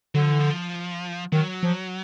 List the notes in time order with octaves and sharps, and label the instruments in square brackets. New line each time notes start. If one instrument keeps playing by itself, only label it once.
[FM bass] D3 [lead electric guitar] F#3
[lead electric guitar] F3
E3
F3
[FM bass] D#3 [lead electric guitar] F#3
[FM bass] F3